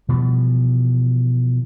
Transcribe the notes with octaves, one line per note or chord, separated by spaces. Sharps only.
B2 E3 F3 G3